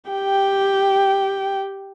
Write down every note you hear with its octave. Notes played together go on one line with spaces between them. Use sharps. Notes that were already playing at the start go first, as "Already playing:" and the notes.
G4 G5